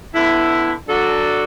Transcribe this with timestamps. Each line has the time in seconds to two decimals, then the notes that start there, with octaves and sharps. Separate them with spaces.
0.14 D3 B3 E4
0.87 F#3 D4 F#4 A4 D5